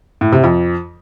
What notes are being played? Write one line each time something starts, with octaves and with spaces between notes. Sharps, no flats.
A2
C3
F2